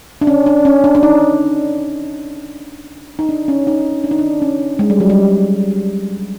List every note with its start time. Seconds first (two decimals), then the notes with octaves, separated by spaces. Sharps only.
0.21 D4
0.27 C#4
0.46 D4
0.65 C#4
0.84 D4
0.95 D4
1.03 D#4
3.19 D#4
3.29 D4
3.48 C#4
3.67 D#4
4.04 D4
4.11 D#4
4.19 D4
4.42 C#4
4.79 G#3
4.90 G3
5.00 F#3
5.10 G3